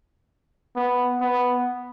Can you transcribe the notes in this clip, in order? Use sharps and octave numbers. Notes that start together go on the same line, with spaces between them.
B3
B3